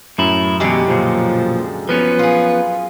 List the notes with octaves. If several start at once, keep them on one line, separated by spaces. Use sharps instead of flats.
F#2 A2 E4
E2 B2 D3 G#3 G4
B1 A#2 F3
F3 B3 C#4 B4
F4 G#4